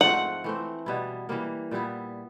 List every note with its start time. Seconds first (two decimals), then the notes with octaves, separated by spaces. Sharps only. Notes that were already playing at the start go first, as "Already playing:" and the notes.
0.01 G#2 F3 A3 C4 F#5
0.44 E3 A3 C4
0.86 B2 G3 B3 E4
1.29 E3 G3 A#3
1.71 A#2 G3 B3 E4